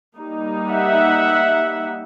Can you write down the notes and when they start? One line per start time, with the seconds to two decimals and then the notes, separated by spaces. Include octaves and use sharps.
0.17 G3 A#3 D#4
0.71 E5 F#5